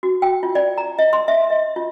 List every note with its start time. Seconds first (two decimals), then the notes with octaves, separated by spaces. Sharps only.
0.03 F#4
0.22 G5
0.43 F4
0.55 D5
0.78 A#5
0.99 D#5
1.13 C6
1.28 E5
1.50 D#5
1.76 F4